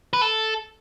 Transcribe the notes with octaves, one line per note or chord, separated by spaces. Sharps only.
B4
A4